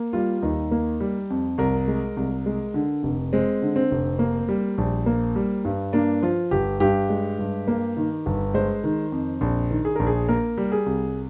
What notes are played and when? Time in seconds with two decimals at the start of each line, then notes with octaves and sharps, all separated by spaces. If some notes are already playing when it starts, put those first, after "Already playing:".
Already playing: A#3
0.13 G3 F4
0.42 D#2 D#4
0.71 A#3
1.00 G3
1.30 F2
1.58 C2 A#4
1.88 G#3
2.17 C2
2.46 G#3
2.74 D3
3.03 F1
3.33 G#3 C4
3.62 D3
3.76 C4
3.91 F1
4.19 A#3
4.49 G3
4.78 A#1
5.06 A#3
5.36 G3
5.65 G2
5.93 A#3 D4
6.22 F3 F4
6.51 G1 G4
6.80 G2 G4
7.10 G#3
7.39 G2
7.68 A#3
7.97 D#3
8.26 G1
8.54 G#3 C5
8.84 D#3
9.12 F2
9.41 A#1
9.71 D#3
9.85 G#4
9.96 A#1 A#4
10.07 G#4
10.29 A#3 A#4
10.58 G3
10.72 G#4
10.86 C2